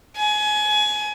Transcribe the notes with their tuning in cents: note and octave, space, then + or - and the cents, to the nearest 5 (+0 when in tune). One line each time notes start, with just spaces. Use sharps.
G#5 +25